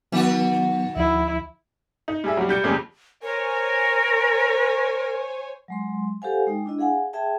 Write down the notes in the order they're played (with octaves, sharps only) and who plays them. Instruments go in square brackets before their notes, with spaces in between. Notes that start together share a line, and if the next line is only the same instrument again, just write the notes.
[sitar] D#3 F#4 [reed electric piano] F#3 B3
[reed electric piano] D2 F3 [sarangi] E4
[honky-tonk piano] D#4
G3 G#4 E5
F#3 G3
G3 G6 C#7
F2 C#3 G3 G#3 A#3
[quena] A#4 [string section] C5 C#5 G#5
[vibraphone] F#3 G#3 C6
G4 A4 C5 F5 F#5 G#5
G#3 D#4 G5
D4 E4 D#5
G#4 F5 F#5 G#5
G#4 E5 G5 A5